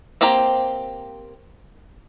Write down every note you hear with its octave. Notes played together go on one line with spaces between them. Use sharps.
A#3 C4 G4 G5 A#5